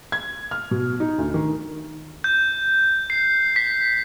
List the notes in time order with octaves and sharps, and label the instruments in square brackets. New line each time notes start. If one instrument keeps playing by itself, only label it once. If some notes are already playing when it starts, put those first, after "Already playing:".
[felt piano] G#6
F6
B2
D#4
D2
D#3
[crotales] G6
C7
B6